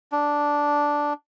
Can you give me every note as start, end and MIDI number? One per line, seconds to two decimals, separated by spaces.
0.12 1.13 62